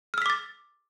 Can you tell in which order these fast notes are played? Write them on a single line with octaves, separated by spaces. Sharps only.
F6 E6 B6 D6 A6